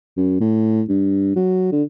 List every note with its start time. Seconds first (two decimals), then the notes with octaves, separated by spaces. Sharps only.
0.17 F#2
0.40 A2
0.89 G2
1.36 F#3
1.72 D3